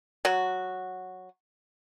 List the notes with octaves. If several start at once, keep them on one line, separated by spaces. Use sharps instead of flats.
F#3 F#4